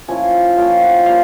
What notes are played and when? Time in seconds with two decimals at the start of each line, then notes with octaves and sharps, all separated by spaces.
0.08 F3 A#3 C#4 E4 G#5
0.57 F3 A#3 C#4 E4 G5
0.82 F#5
1.06 G3 A#3 C#4 F4 F5